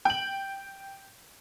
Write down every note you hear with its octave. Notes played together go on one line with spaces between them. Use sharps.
G5 F#7